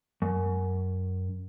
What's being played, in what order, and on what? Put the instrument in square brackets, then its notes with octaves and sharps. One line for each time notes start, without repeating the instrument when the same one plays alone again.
[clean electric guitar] F#2